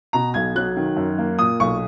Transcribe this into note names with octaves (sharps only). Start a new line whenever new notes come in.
B2 A#5
B1 G#6
F#3 F#6
D#3
F#2
A#3
A#2 D#6
B1 C#6